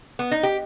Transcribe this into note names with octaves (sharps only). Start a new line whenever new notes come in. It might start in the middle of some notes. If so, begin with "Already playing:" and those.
B3
D#4
G4